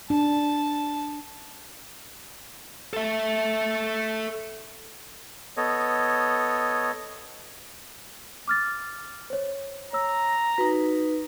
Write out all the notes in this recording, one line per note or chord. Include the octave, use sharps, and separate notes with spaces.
D4 A5
A4 E5
B3 A4 C#5 D#5
D6 F6 A6
C5 C#5
C#5 A#5 E6
D#4 F#4 B4